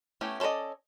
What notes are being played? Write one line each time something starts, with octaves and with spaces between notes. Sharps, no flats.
A3 B3 C#4 E4 G4
C#4 A4 C5 D5 D#5